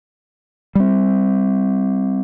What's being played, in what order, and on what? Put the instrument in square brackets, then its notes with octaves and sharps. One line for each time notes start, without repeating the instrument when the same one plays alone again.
[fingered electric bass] G3 C4